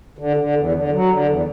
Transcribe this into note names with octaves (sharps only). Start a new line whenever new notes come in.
D3
D3
E2
D3
F#3
D3
E2